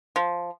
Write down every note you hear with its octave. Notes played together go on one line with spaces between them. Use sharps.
F3